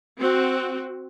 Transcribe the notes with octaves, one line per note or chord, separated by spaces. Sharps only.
C4 F#4